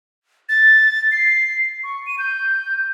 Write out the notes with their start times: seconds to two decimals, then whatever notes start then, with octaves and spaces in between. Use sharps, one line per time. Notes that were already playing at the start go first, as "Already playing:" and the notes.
0.49 A6
1.12 C7
1.83 C#6
2.06 D#7
2.19 G6